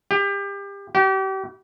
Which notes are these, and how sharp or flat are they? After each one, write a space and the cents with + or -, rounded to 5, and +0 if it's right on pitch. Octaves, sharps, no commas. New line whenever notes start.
G4 +30
G4 -35